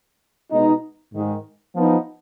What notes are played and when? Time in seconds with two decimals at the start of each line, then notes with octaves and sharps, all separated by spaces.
0.51 B2 G#3 B3 D#4
1.13 G#2 D#3 G#3
1.75 F3 B3 D#4